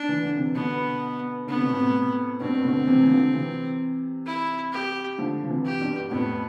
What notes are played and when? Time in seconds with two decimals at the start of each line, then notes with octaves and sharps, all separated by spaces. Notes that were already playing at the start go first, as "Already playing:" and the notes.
Already playing: D4
0.09 E3
0.22 D3
0.35 C3 E3
0.55 B2 D3 B3
1.47 D3 B3
1.56 C3
1.65 B2
1.74 A2 C3
2.40 G2 B2 C4
2.64 B2 D3
2.87 C3 E3
3.03 E3
3.10 D3 F3
3.33 C3 E3
4.26 E4
4.73 G4
5.18 D3 F3
5.44 F3
5.49 C3 E3
5.65 G4
5.80 G2 B2
6.11 F2 A2 B3